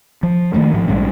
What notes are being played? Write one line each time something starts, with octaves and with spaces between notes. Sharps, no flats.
F3
D#3 E3 A3 A#3
G#2 F3
A#1 G#2 G3 C#4